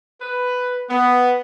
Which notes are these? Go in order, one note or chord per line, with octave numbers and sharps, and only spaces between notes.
B4
B3